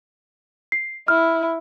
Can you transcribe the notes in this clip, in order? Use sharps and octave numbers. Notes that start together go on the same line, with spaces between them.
C7
E4 F6